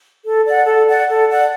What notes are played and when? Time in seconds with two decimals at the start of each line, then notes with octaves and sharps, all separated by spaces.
0.24 A4
0.45 D5 F#5
0.66 A4
0.87 D5 F#5
1.08 A4
1.29 D5 F#5